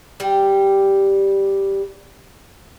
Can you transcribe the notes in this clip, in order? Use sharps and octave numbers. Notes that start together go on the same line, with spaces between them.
G3 G4